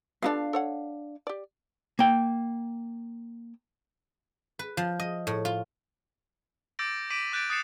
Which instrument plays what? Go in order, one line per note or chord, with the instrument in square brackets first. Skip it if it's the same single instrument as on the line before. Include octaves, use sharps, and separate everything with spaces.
[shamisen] B3 F4 A4 [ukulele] D4 D#4 F5
[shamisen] A4 C#5 F#5
G4 D5
[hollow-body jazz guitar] A#3 G5
[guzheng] B4
F3
D#5
A2
F4
[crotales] D6 E6 G6 A6 A#6 D7
D6 A#6 B6 D7 D#7 F#7
D6 F#6 G6 A6 D7
D#6 F#6 A6 C7 C#7 E7